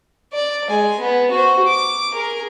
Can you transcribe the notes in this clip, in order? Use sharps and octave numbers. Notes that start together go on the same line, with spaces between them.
D5
G#3 G#5
B3
F#4 C5
D6
G#4 A#4